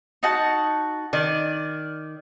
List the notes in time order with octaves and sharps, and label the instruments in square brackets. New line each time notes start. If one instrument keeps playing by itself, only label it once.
[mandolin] D#4 F#4 A5
[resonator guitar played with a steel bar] D#3 [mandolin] D5